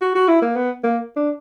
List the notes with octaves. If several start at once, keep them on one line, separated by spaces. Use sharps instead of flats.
F#4
F#4
E4
A#3
B3
A#3
D4